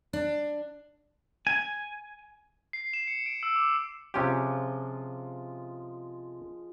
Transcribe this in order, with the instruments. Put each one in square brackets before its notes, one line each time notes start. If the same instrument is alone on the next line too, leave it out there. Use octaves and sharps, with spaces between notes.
[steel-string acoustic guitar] D4
[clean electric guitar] G#5
[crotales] C7
E7
C#7
D7
E6
D6
[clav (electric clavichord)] C3 C#4 G4 [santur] F3 G#3 F4